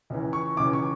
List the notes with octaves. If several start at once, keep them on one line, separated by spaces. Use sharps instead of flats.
C#2 C#3 E3
C#6
C#2 C#3 E3 D6
C#6